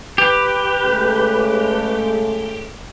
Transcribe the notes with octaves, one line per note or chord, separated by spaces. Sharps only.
G4 B4
C#3 G#3 A3